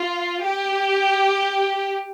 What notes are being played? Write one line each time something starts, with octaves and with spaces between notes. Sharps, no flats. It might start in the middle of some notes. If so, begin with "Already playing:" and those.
Already playing: F4
G4